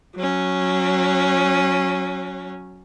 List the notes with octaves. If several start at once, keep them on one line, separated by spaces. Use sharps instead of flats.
F#3 C#4